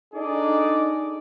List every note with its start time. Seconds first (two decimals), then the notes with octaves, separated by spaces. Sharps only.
0.14 D4 D#4 G#4 A4 D5 D#5